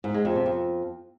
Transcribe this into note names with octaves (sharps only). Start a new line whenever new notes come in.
G#2
G#3
F2
C3
F2